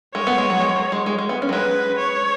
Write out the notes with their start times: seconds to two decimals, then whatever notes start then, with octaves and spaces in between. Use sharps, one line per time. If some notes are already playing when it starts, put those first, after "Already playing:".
0.15 G#3 C#5
0.27 B3
0.38 G#3
0.50 F#3
0.60 G#3
0.76 F#3
0.92 G#3
1.06 G#3
1.18 G#3
1.29 B3
1.42 C#4
1.49 F#3
1.53 G#3 B4
1.99 C#5